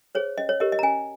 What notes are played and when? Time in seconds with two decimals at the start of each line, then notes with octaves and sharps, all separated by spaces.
0.15 G#4 C5 C#5
0.38 C#4 D#5
0.49 C#5
0.60 G4 A#4 C#5 D#5
0.72 D#5
0.79 A#5
0.83 C#4 G#5